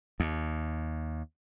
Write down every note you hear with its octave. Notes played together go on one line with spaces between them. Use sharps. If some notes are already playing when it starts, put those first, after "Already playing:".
D#2